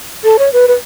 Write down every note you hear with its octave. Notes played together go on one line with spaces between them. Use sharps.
A4
C#5
B4
B4